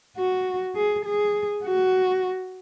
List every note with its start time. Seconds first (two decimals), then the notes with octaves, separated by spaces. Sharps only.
0.17 F#4
0.76 G#4
1.05 G#4
1.64 F#4